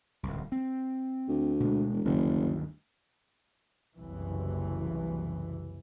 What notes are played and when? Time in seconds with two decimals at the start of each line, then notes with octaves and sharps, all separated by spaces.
0.23 D1 C2
0.52 C4
1.28 D2
1.60 B2 G#3
1.93 E1
2.05 F#1 D2 G2 D#3
3.97 F#1 C2 E3